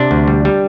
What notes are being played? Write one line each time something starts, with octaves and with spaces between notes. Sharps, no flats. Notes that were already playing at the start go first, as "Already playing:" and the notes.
Already playing: C3 D4
D2
G3
G3